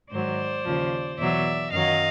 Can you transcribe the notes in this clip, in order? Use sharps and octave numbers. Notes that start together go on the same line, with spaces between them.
G#2 D#3 F#3 C5 D5
D#2 C#3 F3
E2 B2 F#3 D5 E5
F#2 D#3 F#3 D#5 F5